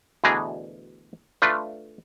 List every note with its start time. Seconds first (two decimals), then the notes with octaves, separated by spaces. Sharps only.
0.24 D2 B2 E3 D4 G#4 A#5
1.42 A3 D4 F4 B4